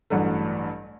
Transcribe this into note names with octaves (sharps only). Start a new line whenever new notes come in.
A1 G2 F#3 A3